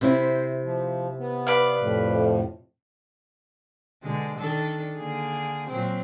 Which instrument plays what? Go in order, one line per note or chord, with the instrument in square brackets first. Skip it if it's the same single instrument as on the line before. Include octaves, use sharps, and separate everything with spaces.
[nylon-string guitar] C3 C4 E4
[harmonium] C5
F3
B3
[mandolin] B4 D5 F5
[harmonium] F2 A2
[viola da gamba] B2 D3 G#3
D#3 D4 A4
D3 A#3 G#4
A#2 F#3 C4